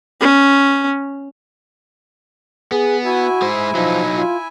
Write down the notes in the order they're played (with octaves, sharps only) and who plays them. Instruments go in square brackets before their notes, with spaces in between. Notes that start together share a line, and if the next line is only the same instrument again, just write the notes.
[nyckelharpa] C#4
[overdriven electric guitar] B3 [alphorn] G#4
[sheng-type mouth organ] E4 E5 G#5 [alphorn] F#4
[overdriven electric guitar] G#3 C5
[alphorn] F3 [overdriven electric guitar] F#3 D#4
[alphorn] F4